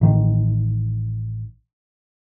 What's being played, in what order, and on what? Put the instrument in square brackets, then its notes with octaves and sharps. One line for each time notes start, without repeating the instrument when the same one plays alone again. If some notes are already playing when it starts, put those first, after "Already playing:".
[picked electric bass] A1 D#3